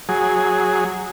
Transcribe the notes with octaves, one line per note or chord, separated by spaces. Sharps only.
F#3 G#4